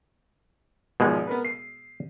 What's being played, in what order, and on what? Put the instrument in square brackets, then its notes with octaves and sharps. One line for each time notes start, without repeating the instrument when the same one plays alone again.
[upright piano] G#1 F3 [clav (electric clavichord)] B2 G#3
[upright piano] B3 A#4 B4
C7